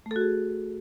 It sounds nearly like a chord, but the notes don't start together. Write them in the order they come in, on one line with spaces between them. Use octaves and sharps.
A3 A4 F#4 G#4